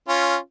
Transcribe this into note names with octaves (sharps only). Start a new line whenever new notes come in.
C#4 F4